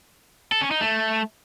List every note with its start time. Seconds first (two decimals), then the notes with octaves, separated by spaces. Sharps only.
0.52 A4
0.62 C#4
0.71 D#4
0.81 A3